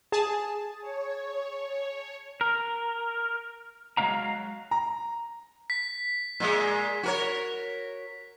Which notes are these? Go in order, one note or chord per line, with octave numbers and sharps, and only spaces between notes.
G#4 A5
C#5
A#4
F#3 G#3 A3 E5 F5 A#5
A#5
B6
A#2 G#3
F#4 A#4 C#5